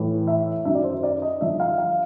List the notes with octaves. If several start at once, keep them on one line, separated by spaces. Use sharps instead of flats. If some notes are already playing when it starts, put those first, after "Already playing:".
Already playing: A2 E3
E5
F#2 D#3 F#3 E5
D5
C5
D5
D#5
G2 D3 F3 E5
F5
F5